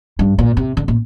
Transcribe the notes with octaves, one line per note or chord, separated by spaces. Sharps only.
G2
A#2
C3
D3
A#2